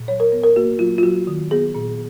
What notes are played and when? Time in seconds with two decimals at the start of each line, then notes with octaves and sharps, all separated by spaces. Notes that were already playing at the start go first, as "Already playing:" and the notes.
Already playing: A#2
0.08 F#3 C#5
0.20 A#4
0.32 B3
0.43 A#4
0.56 A#3 F#4
0.79 F#3 F4
0.98 F4
1.03 F#3 F#4
1.27 D#3
1.51 B3 G#4
1.75 A#2